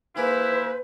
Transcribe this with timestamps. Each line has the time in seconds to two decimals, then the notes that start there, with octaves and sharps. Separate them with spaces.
0.17 A#3 E4 G#4 B4 C5